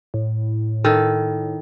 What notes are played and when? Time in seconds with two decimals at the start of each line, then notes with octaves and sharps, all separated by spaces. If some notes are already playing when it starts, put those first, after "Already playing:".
0.14 A2
0.84 D#3 A4